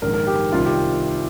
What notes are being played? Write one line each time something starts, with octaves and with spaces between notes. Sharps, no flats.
A#1 G#2 D#3 A#4
A#4
G4
C2 C3 D#3 F4
G4